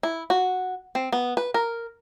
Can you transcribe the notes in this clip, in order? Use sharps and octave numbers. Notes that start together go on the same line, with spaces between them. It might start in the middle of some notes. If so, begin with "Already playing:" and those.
E4
F#4
C4
B3
B4
A#4